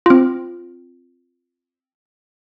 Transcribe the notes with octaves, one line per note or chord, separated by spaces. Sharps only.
C4 F4